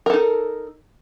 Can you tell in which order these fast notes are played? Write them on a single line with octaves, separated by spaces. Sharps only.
A#4 A4 D#4